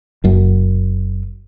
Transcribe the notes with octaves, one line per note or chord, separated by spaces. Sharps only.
F#1 F#2